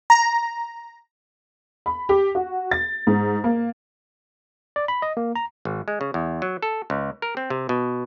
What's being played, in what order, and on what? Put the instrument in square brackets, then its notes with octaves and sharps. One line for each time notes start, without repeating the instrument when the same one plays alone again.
[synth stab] A#5
[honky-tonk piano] B5
G4
F#4
A6
G#2
A#3
[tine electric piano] D5
B5
D#5
A#3
A#5
[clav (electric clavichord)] G#1
G#3
C#3
E2
F#3
A4
C#2
A#4
C4
C3
B2